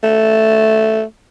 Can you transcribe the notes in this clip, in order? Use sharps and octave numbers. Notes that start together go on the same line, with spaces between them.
A3